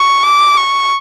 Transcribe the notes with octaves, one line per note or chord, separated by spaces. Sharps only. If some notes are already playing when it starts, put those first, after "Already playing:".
Already playing: C#6
D6
C#6